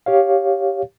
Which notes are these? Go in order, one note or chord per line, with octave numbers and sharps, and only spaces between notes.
G4 C#5 F5